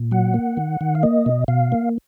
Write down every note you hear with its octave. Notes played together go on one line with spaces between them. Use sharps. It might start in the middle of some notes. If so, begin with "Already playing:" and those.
Already playing: A#2
F#3 F#5
A#3
D#3
D#3
F5
A#3 D#5
B2
B2 F5
A#3